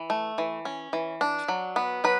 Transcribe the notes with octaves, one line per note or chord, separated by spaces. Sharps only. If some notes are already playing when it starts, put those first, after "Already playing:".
Already playing: E3
A3
E3
C#4
E3
D4
F#3
B3
F#3 B4